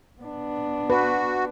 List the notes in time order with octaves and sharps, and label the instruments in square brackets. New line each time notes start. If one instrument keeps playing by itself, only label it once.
[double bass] B3 D4
[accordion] F#4 [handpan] B4